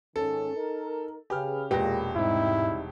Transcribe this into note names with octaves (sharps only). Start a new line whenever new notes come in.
G#2 D#3 C#4 A4
D#4 A#4
C#3 G4 G#4 B4 F6
E1 A#2 G#3 G4 B4 A#6
G#2 C3 G3 C4 D#4 E4